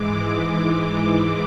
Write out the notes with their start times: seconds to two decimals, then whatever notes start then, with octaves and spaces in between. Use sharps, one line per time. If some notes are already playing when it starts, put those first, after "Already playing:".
Already playing: G#2 E3 G#3 D6
0.29 D6